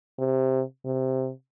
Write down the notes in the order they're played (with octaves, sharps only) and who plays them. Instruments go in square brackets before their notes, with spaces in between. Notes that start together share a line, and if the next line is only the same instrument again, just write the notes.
[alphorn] C3
C3